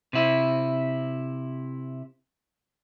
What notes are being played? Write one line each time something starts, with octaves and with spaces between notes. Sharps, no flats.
C3 E4